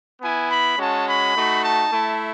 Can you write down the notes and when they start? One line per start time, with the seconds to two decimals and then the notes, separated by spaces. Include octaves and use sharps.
0.21 B3 E4 G#5
0.49 B5
0.77 G#3 C#4 F#4 A5
1.06 B5
1.34 A3 D#4 F#4
1.62 A5
1.90 A3 E4